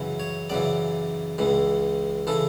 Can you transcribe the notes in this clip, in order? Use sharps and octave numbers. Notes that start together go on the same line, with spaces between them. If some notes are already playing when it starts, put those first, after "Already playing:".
Already playing: F#2 C#3 E3
C#5
F#2 C#3 E3 D5
C#2 C#3 E3
C#3 E3 A4